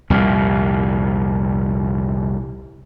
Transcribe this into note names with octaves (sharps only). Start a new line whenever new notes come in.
C2 F2 A#2